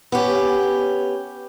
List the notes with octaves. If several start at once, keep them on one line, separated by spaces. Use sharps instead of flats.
B3 C#4 G4